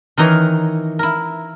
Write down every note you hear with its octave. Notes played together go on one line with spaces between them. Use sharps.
D#3 E3 D#4 A#4 C#5
E4 A#4